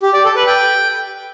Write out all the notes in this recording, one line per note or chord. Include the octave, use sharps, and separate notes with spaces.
G4
D5
A4
B4
G5